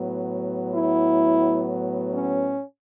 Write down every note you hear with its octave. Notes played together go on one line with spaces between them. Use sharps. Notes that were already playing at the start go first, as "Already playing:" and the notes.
Already playing: A2 F#3 B3
E4
C#4